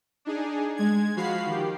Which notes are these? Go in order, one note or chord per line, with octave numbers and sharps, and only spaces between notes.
D4 D#4 G#4
G#3 G#6
F3 F#4 F5 B5 C7
D#3 G4